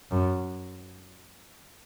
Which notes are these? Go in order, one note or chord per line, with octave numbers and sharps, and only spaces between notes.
F#2